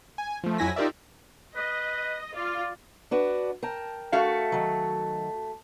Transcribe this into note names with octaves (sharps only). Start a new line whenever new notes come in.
G#5
F3 A3
F2 F#3 E4 G#5 A#6 B6
D#4 F4 G4 A#4 D5 E5
B4 D#5
F4 D5
D4 F#4 B4
A#4 G5 A5
A3 F#4 F5
D#3 F#3